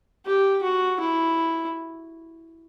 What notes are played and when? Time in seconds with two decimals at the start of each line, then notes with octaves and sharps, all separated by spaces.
0.25 G4
0.63 F#4
1.00 E4